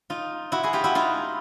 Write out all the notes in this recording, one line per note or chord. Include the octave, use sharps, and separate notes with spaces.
D#4 F4
E4 F#4
F#4 G#4
F4 G4
E4 F#4
D#4 F4